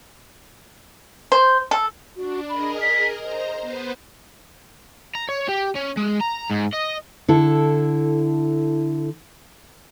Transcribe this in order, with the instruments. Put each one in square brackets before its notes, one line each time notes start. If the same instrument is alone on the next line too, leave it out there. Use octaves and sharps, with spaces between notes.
[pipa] C5
A4
[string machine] D4 [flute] F#4
[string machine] G#4 A#4 D#5 [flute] B5
[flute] B6
[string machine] C5 A#5 [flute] D#5
[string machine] B3 B4 C5
[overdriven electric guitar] A#5
C#5
G4
C#4
G#3
A#5
G#2
D#5
[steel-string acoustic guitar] D3 E4 A4